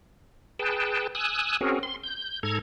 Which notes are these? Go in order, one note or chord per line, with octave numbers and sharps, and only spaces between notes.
G#4 B4 G5 A5
G#5 D#6 E6 F#6
C4 C#4 F#4 G#4 A#4
C6
G6
G#2 A4 A#5 G#6